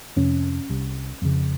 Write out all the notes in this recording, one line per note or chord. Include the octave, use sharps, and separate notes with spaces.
F2 C3 C#4
C2 C3
F2 C#3